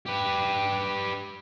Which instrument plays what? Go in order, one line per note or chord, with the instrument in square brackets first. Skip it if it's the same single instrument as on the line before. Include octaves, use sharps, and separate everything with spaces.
[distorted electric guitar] G4 B4